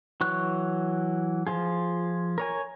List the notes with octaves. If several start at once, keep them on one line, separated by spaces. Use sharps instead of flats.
E3 F#3 C#6 F#6
F3 F4 G#4
A#4 C#5 G#5